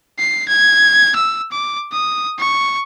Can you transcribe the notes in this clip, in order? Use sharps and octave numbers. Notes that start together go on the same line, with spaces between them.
C7
G#6
E6
D6
D#6
C#6